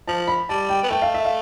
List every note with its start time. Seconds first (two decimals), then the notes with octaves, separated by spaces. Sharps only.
0.07 F3 A5
0.28 B5
0.49 G3 A5
0.70 G5
0.83 B3
0.90 A3 G5
1.02 F5
1.14 E5
1.25 F5